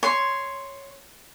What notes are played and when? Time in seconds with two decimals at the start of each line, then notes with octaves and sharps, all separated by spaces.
0.03 C#5 C6